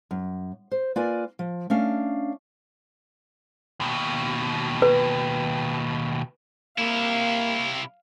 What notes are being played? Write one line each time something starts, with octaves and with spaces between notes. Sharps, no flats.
F#2
C5
A#3 F4 A#4 B4 D5 G#5
F3
A3 C#4 D4 F5
D#2 B2
B4
C3 A#3 E4 F5